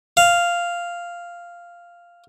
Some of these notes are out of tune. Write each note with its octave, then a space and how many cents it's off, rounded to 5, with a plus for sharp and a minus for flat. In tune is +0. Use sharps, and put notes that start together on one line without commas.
F5 -5